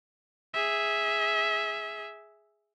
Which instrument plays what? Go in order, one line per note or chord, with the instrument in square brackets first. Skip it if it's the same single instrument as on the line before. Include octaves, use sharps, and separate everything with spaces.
[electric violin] G#4 E5